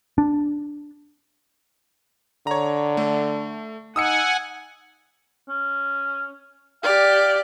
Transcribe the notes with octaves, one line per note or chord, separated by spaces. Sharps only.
D4
D3 C#5 A#5
A3
D#4 F#5 G#5 D#6 E6 C#7
C#4
G4 D5 F5